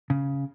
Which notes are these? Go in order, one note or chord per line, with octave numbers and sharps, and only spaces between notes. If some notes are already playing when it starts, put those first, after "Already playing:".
C#3